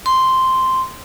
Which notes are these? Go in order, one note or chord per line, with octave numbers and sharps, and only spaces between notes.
C6